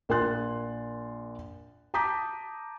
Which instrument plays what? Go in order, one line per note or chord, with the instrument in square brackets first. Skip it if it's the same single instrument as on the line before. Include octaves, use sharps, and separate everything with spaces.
[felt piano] A#1 A#4 G#5 C6 F#6 A6
A5 A#5 D6 D#6 G6 B6